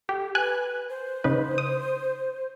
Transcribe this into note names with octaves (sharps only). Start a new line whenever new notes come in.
G4 A4
B4 G#5 F#6
C5
C#3 D#4 B4
D#6